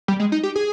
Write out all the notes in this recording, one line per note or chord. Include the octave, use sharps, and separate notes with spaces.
G3
G#3
D#4
G4
G#4